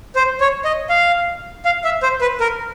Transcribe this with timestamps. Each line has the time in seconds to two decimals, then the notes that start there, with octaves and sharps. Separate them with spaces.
0.15 C5
0.41 C#5
0.65 D#5
0.90 F5
1.65 F5
1.84 E5
2.03 C5
2.21 B4
2.40 A#4